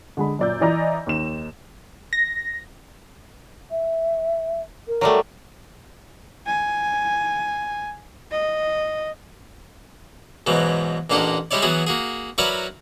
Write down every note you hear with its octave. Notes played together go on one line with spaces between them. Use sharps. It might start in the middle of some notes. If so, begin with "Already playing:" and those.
D3 G#3 B5
F#2 A#2 D5 E6 G6
E3 D5 D#5 A#5 G6 A#6
D#2 D#4 E7
A#6
E5
A#4
F#3 G3 A3
G#5
D#5
G#2 B2 E3 F#3
A1 A#2 A#3 D4 D#5 F#5
G3 G#3 E4 C#5 D5
E3 F#3 B3 F#4 G#4
A#3 F#4 G#4
F#3 E4 F#4 A#4 B4 D5